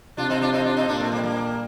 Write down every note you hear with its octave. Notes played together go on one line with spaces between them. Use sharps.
C3 D4 F4
C4 D#4
D4 F4
C4 D#4
D4 F4
C4 D#4
A#2 A#3 D4
A3 C4
G3 A#3
G3 A#3